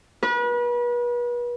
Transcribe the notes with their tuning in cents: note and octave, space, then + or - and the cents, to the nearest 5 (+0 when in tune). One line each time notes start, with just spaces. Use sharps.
B4 -35